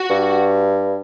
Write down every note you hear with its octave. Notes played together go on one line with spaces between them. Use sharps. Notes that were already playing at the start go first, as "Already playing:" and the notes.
Already playing: F#4
G2